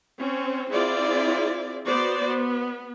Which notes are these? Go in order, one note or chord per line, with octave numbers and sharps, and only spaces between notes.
C4 C#4
C4 E4 F4 G#4 D5
B3 F#4 C5 D5
B3